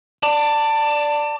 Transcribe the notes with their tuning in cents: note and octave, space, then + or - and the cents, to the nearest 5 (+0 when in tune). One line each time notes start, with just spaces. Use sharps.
D5 +0 A5 +25